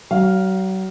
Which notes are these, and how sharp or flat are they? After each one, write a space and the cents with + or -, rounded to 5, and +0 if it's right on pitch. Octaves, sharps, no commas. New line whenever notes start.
F#3 +40 F5 +0